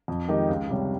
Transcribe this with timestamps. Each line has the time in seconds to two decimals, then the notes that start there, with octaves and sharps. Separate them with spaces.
0.08 F2
0.28 D#3 G#3 D#4 G4
0.49 C#2
0.69 C3 G3 C#4